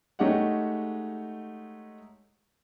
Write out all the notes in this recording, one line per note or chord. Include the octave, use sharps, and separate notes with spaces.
G#3 A3 D#4 G4 C#5 F#5